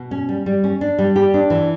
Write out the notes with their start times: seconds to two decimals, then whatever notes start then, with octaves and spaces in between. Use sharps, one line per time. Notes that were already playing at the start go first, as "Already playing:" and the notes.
Already playing: B2
0.11 C#4
0.29 G3
0.46 G3
0.64 C#4
0.81 D4
0.99 G3
1.16 G4
1.34 D4
1.50 E3